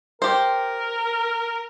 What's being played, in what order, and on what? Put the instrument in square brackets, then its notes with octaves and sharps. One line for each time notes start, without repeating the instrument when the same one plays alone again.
[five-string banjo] G4 C5 [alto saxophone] A#4